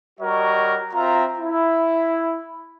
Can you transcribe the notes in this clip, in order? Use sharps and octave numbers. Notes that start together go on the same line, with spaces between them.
G3 F#4 A#4 C#5 D#5
C4 F4 E5 A#5
E4